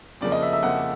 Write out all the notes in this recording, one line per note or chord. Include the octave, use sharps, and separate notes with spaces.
F2 C#3 F3 A#3 D5
D#5
E5
E5
F2 C#3 F3 A#3 F#5